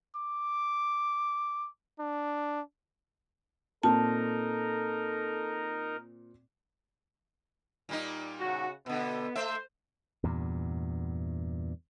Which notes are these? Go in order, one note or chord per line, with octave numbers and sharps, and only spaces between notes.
D6
D4
A#2 A#3 C4 D#4 A4 A#4 A5
A#2 G3 D#4
C#3 F#4
B2 D3 B3
A3 C5 E5
E2 G2 A#2